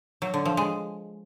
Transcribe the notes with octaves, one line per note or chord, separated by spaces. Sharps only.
F#3
D3
F3
G#3